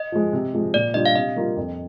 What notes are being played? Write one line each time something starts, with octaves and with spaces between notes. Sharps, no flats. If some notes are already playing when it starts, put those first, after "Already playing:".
Already playing: D#5
F3 G#3
C3
F3 G#3
A#2 D5
G3 D4 F4 D#5
F5
C3 D#5
G3 A#3 F4
F2